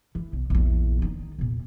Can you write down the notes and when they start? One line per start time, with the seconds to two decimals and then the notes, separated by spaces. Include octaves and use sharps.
0.15 E3
0.33 B1
0.50 A#1 E2
1.02 D#3 D#4
1.39 E2 A#2